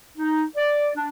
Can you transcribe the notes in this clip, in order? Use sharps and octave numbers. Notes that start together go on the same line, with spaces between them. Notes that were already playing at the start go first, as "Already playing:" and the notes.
D#4
D5
D4